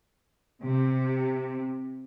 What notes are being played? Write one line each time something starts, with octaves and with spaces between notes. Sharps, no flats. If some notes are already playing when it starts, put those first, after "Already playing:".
C3